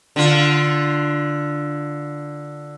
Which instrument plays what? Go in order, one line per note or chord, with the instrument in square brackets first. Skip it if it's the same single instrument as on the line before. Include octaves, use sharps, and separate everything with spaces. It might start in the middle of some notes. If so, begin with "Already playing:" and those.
[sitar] D3 F4